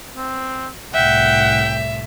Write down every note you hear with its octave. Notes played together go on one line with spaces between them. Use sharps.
C4
C2 A2 E5 F#5 G5